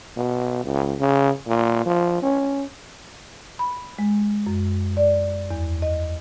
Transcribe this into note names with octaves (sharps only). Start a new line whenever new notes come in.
B2
C#2
C#3
A#2
F3
C#4
B5
G#3
F#2
D5
E2
D#5